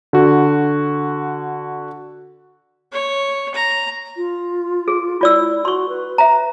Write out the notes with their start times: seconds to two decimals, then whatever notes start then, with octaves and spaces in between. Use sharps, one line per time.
0.13 D3 F#4
2.92 C#5
3.54 A#5
4.17 F4
4.88 G#4
5.21 E4 F4 D5 E6
5.65 F#4 C6 C#6
5.89 B4
6.18 E5 A#5